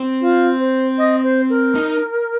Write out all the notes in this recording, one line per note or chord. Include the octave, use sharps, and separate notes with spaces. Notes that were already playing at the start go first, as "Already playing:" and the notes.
Already playing: C4
F4
C5
D#5
C5
A#4
D#4